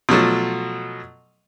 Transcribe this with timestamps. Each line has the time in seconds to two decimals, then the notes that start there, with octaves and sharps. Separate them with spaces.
0.09 B2 F3 F#3 A3